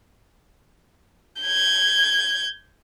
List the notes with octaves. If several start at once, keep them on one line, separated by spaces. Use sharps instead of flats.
G6 G#6